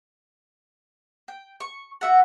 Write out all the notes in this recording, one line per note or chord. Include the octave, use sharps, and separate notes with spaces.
G5
C#6
F#4 E5 F#5